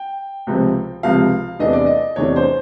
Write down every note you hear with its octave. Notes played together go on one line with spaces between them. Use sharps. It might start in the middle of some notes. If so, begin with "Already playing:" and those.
Already playing: G5
C#2 C3 F3
C#2 C3 F3 F5
E2 C3 E3 A3 D4 D#5
D5
D#5
E2 C3 E3 A3 D4 C#5
C5